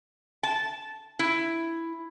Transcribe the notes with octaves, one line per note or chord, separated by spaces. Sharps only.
A5
E4